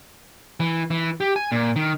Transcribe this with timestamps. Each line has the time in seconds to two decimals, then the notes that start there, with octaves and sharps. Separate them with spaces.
0.60 E3
0.91 E3
1.20 G4
1.36 G#5
1.52 A#2
1.76 D#3